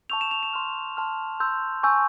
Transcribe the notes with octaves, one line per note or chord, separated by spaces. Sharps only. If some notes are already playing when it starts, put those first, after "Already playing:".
A5 C#6 E6 G6 F7
E7
F7
E7
C6 F6
A5 C6 F6
C6 E6 G6
G#5 C#6 E6 G6